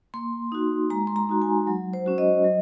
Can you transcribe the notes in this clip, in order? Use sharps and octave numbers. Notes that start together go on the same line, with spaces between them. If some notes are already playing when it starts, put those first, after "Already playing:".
A#3 C6
D#4 F#4
G#3 A#5
C6
A#5
D#4 F#4
G#5
F#3
C5
C#4 F#4
D#5
F#3